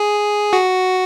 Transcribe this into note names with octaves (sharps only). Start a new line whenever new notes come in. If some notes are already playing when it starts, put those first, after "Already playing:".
Already playing: G#4
F#4